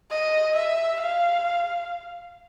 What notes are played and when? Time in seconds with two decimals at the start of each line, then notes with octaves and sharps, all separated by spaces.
0.11 D#5
0.56 E5
1.01 F5